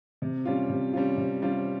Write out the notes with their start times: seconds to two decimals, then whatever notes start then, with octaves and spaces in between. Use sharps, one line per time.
0.22 C3
0.45 G3 C#4 F4
0.69 C3
0.93 G3 C#4 F4
1.17 C3
1.42 G3 C#4 F4